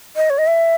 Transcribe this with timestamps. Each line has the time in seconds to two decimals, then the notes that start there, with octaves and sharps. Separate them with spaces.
0.16 D#5
0.30 C#5
0.38 D#5
0.47 E5